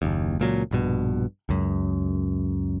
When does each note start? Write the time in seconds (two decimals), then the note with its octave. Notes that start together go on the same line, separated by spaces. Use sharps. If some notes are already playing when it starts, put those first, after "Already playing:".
0.02 F#1 D#2
0.40 C#2 A#2 F#3
0.71 A#1 G2 B2
1.49 C#2 F#2